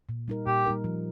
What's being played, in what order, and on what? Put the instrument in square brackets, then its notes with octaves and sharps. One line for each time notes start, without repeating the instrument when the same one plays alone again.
[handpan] A#2
G3 D#4 A#4
[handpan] A#2 [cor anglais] G4
[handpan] G3 D#4 A#4
F3